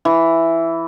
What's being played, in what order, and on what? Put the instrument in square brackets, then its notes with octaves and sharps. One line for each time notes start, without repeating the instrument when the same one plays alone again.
[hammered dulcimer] E3